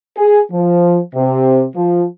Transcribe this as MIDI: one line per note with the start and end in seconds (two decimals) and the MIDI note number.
0.17 0.39 68
0.52 0.98 53
1.15 1.65 48
1.76 2.03 53